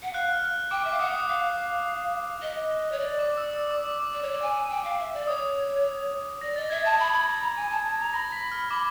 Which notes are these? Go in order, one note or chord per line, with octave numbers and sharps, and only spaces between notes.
F#5
F5 F#6
F6
G5 D6
E5 D6
F5
F#5 D#6
D#6
F5
D#5
C#5
D5
D6
E6
E6
D6
D6
D6
D5
C#5
D5
G#5
G5
F5
E5
D5
C#5 D#6
D5 A#6
D#5 A6
E5 G#6
A5 A6
B5 G#6
B5
B5
A#5
G#5
A5
A5
A#5
B5 A#6
B6
F6
B5 D6